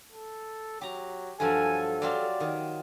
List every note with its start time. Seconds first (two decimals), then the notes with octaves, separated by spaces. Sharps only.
0.12 A4
0.81 F#3 G4 A#5
1.40 G2 F3 F#3 A4 G#5
2.02 F#3 F4 G4 D5
2.40 D#3